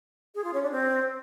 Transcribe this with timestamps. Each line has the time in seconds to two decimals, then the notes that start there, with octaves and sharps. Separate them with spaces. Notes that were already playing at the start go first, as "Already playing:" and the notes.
0.35 G#4
0.44 F4
0.53 C#4
0.63 D4
0.72 C4